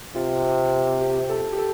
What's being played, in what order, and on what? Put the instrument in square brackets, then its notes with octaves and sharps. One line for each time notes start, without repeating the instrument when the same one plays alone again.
[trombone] C3 [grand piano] F4
[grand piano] G4
A4
G4
A4